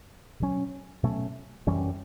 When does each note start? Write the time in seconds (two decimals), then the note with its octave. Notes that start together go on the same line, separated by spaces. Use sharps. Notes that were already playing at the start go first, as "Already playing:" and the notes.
0.40 B2 F#3 C#4
1.03 B2 F#3 A3 C#4
1.67 F#2 E3 G3 C#4